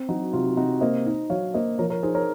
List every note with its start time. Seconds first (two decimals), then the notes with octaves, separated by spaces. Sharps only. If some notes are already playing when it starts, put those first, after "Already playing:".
Already playing: C4
0.08 F#3 D#4 F#4
0.33 C3 F4
0.47 F4
0.57 C3 D#4 F#4
0.81 A#3 C5 D#5
1.06 D#4
1.30 F#3 C#5 F5
1.54 A#3 C5 D#5
1.79 F3 A#4 C#5
1.90 A#4 C#5
2.03 D#4 G#4 C5
2.14 A#4 C#5